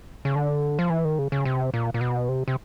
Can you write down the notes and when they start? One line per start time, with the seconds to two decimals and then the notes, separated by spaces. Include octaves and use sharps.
0.25 C#3
0.36 D3
0.79 F3
0.90 E3
1.05 D#3
1.19 C#3
1.32 C#3
1.45 C3
1.74 A#2
1.94 A#2
2.01 B2
2.29 C3
2.48 C3